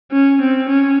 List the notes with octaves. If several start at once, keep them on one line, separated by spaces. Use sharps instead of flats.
C#4
C4
C#4